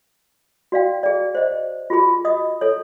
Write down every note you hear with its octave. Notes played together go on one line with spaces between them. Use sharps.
F#4 D5 F5 G5
G#4 D5
C5 D#5
F4 F#4 G#4 B5
D#5 D#6
A4 C#5